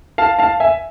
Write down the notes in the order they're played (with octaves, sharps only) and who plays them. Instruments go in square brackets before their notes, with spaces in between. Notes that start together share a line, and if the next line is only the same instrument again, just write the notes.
[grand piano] F5 A5
F5 A5
E5 G#5